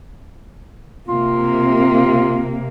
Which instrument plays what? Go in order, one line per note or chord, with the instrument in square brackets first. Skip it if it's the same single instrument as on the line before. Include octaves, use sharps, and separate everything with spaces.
[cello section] C3 A#3 [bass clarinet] F4